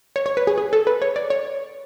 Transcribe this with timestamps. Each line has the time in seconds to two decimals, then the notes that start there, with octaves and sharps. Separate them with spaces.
0.16 C#5
0.26 C#5
0.37 B4
0.47 G#4
0.58 G#4
0.73 A4
0.87 B4
1.02 C#5
1.16 D5
1.30 C#5